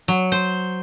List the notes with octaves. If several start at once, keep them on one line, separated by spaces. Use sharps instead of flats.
F#3
C5